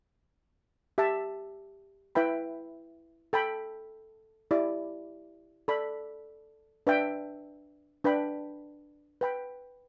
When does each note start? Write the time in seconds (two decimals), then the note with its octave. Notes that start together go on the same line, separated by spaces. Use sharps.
0.98 G4 E5 A5
2.15 E4 B4 E5 G5 B5
3.33 A4 G5 B5
4.51 E4 G4 D5
5.68 A4 D5 B5
6.87 D4 B4 E5 G5
8.04 D4 B4 G5 B5
9.21 B4 G5 B5